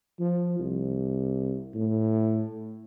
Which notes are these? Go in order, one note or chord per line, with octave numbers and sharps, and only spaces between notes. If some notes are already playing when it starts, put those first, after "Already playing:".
F3
C2
A2